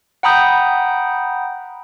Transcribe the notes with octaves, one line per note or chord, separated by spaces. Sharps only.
F#5 G5 A#5 B5 D#6 G6